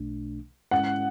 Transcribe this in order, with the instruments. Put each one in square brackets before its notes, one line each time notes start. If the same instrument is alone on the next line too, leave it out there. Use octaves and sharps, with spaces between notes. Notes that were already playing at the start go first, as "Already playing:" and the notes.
Already playing: [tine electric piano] B1 B2 A3 D4
[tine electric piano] G#2 G#3 C#4 E4 [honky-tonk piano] F#5